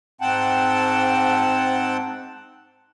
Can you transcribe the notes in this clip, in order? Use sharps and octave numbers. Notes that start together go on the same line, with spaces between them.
G#2 C4 F#5 G5 A5